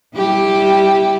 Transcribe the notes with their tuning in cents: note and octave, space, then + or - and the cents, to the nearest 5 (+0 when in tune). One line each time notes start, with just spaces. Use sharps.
G3 +0 E4 -15 G4 +0